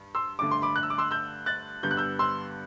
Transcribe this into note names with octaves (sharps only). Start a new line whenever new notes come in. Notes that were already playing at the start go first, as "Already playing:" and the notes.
Already playing: G2
C6 E6
G2 D3 A3 D6
C6
B5 D6
F#6
E6
D6
C6 E6
E6 G6
F#6 A6
G2 D3 G3 B3 G6
F#6
E6 G6
C6 E6